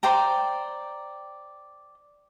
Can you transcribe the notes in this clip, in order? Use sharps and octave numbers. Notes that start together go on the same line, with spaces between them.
C5 D5 G5 A#5